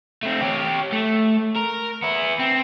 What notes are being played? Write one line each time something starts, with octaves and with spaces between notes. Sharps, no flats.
A3 C4
G4 C#5
A3
A#4
B3 E4
C4